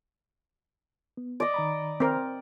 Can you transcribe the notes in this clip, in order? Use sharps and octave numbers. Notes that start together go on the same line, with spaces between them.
B3
D5 D#5
D#3 A#5 B5
C4 A#4